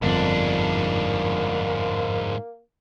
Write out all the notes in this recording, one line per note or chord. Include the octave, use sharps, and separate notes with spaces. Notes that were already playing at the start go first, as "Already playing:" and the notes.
G1 F2 G#2 A#3 D4